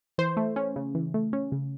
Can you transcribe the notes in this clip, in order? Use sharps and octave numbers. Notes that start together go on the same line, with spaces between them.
E3 C5
A3
C#4
C#3
E3
A3
C#4
C#3